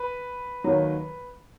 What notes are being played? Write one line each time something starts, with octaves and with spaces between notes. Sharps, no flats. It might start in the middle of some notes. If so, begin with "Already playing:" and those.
Already playing: B4
D#2 D#3 F#3